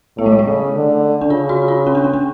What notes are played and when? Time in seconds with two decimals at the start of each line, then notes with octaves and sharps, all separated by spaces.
0.18 A2 B3
0.26 A3
0.32 G#3
0.39 A3
0.46 C#3
0.75 D3
1.21 D4
1.30 C#3 F4
1.49 F#4
1.68 F4
1.87 C#4
1.95 D4
2.04 C#4
2.14 D4